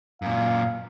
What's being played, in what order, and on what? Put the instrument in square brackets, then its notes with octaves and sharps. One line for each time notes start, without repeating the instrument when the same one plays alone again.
[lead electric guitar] F#2 A#2 [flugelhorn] F5